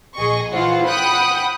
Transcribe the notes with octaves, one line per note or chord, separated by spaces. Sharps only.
A#1 G#4 D#5 C#6
E3 F4 C5 F#5
F#5 G5 B5 D#6 F#6